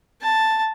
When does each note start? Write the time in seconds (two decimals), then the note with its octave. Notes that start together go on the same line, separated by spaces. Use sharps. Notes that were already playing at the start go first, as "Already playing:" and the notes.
0.21 A5